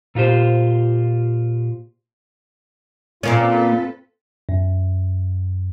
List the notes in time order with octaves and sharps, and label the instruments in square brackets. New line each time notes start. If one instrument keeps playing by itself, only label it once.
[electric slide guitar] A#2 F4 G4 C5
[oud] A#2 A#3 C#4 [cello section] C4 A4 B4 [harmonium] F4
[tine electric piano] F#2